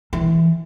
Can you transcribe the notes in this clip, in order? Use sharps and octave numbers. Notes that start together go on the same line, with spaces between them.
E3